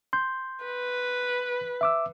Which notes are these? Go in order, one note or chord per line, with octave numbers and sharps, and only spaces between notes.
C6 G6
B4
E5 D6 E6